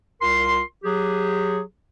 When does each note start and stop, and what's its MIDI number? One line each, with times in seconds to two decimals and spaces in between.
0.22 0.61 36
0.22 0.61 65
0.22 0.61 70
0.22 0.61 84
0.84 1.59 54
0.84 1.59 67
0.84 1.59 68